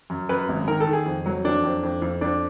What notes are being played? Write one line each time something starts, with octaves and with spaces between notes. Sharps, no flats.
F#2
F#2 B4
G#1
D#3 A#4
A4
D#3
G#4
F2
F#3
F2 D4
F2
F2
F2
F2 D4